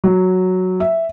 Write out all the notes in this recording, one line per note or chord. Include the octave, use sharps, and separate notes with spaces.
F#3
E5